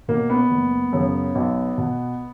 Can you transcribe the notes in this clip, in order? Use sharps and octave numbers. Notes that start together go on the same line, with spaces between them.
B2 A#3
B3
F#1
F#2 C#3
B1
B2